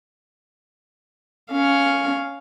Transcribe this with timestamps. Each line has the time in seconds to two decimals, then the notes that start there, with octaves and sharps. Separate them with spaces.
1.52 C#4 F5